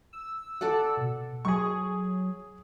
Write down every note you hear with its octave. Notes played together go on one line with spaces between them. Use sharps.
E6
A4 D5 F#5
B2
F#3 G#4 C#6